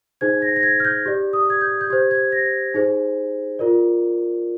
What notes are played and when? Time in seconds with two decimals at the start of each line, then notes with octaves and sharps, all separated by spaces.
0.21 D#4 G#4 C5 G#6
0.42 A#6
0.56 A#6
0.63 G#6
0.80 F6
0.85 G6
1.06 G4 D5
1.33 D#6
1.50 G#6
1.61 G6
1.81 G6
1.90 G4 C5 G#6
2.11 G#6
2.32 A#6
2.74 D#4 G#4 C5
3.59 F4 A#4 D5